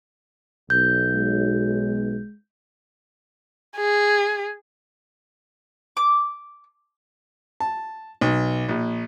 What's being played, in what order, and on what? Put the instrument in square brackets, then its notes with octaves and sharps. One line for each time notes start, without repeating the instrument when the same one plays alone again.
[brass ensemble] B1 [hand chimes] G6
[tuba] G#3
[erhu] G#4
[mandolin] D6
[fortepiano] A5
B1
A#1